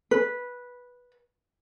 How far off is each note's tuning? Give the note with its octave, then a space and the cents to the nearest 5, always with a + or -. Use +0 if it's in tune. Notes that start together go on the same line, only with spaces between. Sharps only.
B4 -10